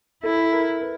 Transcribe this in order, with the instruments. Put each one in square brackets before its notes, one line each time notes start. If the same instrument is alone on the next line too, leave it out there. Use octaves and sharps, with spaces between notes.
[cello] E4 [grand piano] A4
[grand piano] A#4
B4